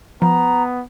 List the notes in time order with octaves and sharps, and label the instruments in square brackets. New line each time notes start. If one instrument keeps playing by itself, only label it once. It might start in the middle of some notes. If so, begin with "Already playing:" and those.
[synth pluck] F3 [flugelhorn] B3 [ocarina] A#5